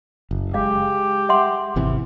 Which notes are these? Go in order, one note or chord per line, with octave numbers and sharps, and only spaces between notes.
F#1
G#3 G4 F5
E5 F#5 C6
G#1 C3 E3